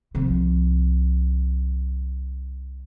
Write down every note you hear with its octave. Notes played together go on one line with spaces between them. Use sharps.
C2 F3